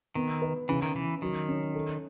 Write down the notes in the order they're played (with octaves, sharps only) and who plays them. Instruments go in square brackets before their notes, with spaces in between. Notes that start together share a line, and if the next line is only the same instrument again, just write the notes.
[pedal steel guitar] D#3 [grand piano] B3
[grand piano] B4
[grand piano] C#3 [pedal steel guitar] E3
[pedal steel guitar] D#3
[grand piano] C#3 [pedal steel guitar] E3
[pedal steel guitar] D#3 [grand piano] F#3
[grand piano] C#4
A4